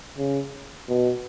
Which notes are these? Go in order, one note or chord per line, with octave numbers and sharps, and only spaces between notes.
C#3
B2